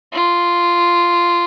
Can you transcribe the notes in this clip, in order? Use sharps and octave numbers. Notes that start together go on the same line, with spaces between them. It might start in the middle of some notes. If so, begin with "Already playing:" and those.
F4